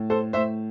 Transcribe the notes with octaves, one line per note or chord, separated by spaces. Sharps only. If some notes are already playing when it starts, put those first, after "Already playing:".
Already playing: A2
A4 C5
A2 C5 E5